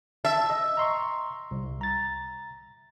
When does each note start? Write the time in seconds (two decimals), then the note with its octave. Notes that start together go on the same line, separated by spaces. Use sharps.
0.25 E5 A5
0.50 D#5
0.77 A#5 C6 C#6
1.51 C2
1.81 A#5 A6